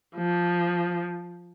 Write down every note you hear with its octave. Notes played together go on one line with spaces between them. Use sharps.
F3